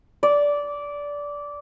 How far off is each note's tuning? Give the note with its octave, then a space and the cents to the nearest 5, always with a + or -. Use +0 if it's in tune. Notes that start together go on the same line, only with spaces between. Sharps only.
D5 -15